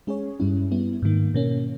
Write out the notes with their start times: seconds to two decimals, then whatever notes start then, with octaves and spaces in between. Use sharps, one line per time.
0.07 G#3 C#4 G#4 C#5
0.40 G2 G3 C#4 E4
0.71 G3 B3 E4
1.02 G#2 D#3 A#3
1.34 B2 A#3 C#4